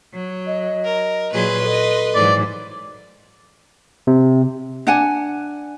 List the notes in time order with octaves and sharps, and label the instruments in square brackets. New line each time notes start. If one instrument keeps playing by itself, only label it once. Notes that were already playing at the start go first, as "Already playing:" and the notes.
[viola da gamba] F#3
[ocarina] D#5
[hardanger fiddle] A#4
[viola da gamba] A#2 F#3 G#4 [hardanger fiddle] B4 C6
[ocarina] A4 [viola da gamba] D#5
[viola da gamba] G#2 E3 F#3 [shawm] D5
[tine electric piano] C3
[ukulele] D4 F#5 G#5